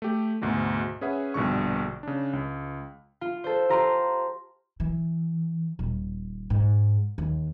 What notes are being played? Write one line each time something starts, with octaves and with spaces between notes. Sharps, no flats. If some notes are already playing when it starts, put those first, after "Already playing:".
A3 G4
D2 G#2 B2 G#3
C#4 G#4 B4 E5 F#5
A#1 G2 B2 D3 C#6
C#3 D4
C#2
F4
A4 C5
F4 G4 A#5 C6
E3
D#1
G#2
D#2